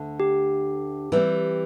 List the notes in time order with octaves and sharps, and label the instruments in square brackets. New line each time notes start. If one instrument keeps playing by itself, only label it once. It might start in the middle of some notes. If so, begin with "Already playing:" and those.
Already playing: [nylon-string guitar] D2 D3 A3
[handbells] G4
[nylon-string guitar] E3 G3 C4